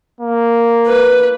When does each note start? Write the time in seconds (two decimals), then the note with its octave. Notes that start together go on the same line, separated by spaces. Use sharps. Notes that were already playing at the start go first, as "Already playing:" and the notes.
0.21 A#3
0.87 B4